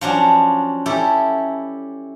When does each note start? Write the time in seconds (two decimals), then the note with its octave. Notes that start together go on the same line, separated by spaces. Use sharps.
0.01 F3 F#3 C#4 D4
0.86 C#4 E4 G4 A4